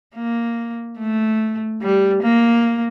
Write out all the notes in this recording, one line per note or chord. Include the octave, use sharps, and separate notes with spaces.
A#3
A3
G3
A#3